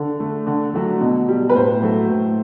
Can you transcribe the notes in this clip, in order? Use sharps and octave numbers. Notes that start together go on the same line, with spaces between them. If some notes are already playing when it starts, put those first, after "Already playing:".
Already playing: D3
A3
D3
F#3 A3
B2
G3
B4
A2 C5
F#3 A3
A2